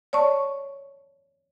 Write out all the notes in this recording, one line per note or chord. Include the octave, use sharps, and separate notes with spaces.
C#5 D5 A5 C#6